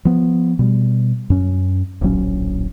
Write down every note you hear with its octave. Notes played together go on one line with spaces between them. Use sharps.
F3 B3
B2 G3
F#2 C#4
D1 A#1 F#3 C#4